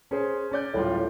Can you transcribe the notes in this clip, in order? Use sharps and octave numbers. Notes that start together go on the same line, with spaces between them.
C#4 G#4 C5
C#4 D5 G6
D1 A2 G3 F4